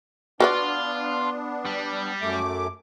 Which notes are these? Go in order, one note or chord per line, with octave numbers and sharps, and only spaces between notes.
B3 D4 F4 F#4 B4 D5
G3
F#2 A3 D6